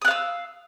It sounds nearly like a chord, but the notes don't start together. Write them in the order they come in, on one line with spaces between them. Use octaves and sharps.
D#6 F#6 F5 E6